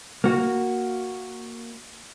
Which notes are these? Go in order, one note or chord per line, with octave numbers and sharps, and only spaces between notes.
A#3 F#4